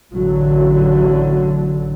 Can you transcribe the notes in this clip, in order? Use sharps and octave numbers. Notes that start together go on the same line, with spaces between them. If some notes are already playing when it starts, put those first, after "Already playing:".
A1 A2 D3 F#3